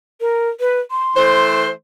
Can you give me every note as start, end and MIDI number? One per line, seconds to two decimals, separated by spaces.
0.21 0.49 70
0.60 0.80 71
0.91 1.52 84
1.16 1.69 52
1.16 1.69 57
1.16 1.69 72